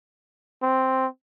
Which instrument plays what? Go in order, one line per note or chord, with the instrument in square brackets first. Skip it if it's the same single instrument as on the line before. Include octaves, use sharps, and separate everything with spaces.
[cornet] C4